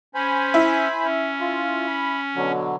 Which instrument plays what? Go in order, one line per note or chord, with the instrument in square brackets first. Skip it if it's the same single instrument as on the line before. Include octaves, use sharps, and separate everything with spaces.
[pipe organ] C#4 [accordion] C5 G#5 B5
[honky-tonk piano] E4
[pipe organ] C#4
[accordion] F4
B5
B2 D3 F#3